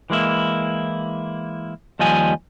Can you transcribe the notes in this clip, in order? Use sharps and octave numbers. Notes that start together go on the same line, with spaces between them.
E3 G#3 A#3 E4
D#2 F3 G3 D#5 G#5